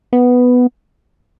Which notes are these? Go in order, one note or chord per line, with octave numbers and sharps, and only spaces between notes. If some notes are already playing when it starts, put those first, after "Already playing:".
B3